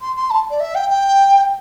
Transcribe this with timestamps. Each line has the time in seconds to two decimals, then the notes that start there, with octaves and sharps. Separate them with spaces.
0.01 C6
0.16 C6
0.30 A5
0.50 D5
0.60 E5
0.75 G5
0.90 G5